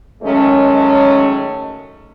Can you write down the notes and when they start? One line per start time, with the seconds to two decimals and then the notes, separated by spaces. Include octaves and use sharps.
0.23 D#3 F#3 G#3 A3 C#4